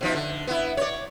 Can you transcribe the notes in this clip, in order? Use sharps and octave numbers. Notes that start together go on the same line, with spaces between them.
B2 F3 D#4
D3
B3 E4
C#5 D5